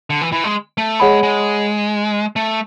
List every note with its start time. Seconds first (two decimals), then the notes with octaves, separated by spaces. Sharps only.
0.10 D3
0.21 E3
0.32 E3
0.44 G#3
0.78 A3
1.00 G#3 G#4 C#5 F#5 B5
1.23 G#3
2.36 A3